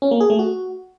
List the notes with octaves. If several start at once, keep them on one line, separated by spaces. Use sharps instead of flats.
C#4
A#3
G#4
A3
F#4